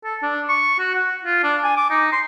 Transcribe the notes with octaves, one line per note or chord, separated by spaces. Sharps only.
A4
D4
C#6
F#4
F#5
F4
D4
G#5
D6
D#4
C6